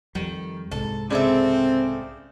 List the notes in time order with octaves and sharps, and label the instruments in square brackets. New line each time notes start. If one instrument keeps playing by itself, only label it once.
[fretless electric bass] F2 G3 [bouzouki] D#3
[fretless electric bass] C2 G#2 [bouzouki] A4
[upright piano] C#3 D5 [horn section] C4 [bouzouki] G#4 A4 E5